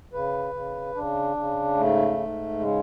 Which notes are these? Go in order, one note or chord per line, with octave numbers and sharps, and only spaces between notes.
C#3 B4
C#3
C#3 D4
C#3
G#2 A3
G#2
C#3 G#3